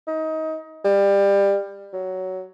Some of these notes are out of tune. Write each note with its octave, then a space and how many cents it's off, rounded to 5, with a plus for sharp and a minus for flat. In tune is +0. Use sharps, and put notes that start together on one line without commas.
D#4 +25
G3 +25
F#3 +10